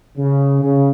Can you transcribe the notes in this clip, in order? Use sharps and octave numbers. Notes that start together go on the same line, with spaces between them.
C#3
C#3